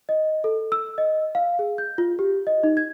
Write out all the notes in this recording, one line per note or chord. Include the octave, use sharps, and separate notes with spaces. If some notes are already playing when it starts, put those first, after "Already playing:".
D#5
A4
E6
D#5
F5
G#4
G6
F4
G4
D#5
D#4
G#6